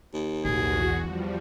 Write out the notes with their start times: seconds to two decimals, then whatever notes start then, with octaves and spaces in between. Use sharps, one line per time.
0.14 D#2
0.45 B1 E2 A2 F#4 G#4
1.03 E2 F3 G3